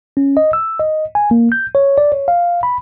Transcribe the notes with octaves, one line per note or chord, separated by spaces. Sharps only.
C#4
D#5
E6
D#5
G#5
A#3
G6
C#5
D5
C#5
F5
B5